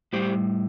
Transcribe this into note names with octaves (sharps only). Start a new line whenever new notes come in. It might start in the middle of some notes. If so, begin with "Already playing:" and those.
A2 G3 G4 C5